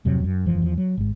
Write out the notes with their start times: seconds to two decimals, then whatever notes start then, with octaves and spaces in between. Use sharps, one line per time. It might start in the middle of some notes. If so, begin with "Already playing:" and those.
0.05 D1 F2 C3 F#3
0.24 F#2
0.46 E1 F#2 E3 F3
0.62 E2 F3
0.78 F#3
0.97 G#1 G#2